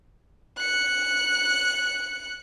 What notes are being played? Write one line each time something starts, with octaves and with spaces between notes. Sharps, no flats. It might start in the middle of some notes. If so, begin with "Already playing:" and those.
F#6 C#7